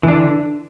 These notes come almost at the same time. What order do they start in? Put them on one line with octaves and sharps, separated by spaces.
E3 D4 D3